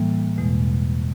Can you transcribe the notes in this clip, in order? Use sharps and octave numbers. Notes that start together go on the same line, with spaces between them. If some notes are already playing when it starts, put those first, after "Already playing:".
Already playing: A2 E3 G3 A#3
E2 B2 G#3